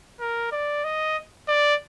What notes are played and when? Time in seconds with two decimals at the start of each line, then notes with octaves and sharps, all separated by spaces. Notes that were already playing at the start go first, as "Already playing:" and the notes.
0.20 A#4
0.52 D5
0.84 D#5
1.48 D5